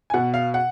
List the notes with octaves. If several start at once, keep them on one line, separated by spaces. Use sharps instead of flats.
G#5
B2 F#5
F5
F#5